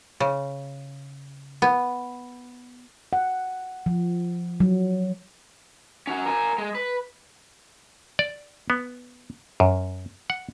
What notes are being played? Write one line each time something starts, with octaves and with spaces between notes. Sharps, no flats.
C#3
B3
F#5
F3
F#3
C#4 F#4
A#4 G#5
G#3
B4
D5
B3
F#2
F#5